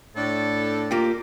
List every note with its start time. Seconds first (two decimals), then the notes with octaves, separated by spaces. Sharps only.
0.16 A2 D4 A4
0.91 A#3 F4 G4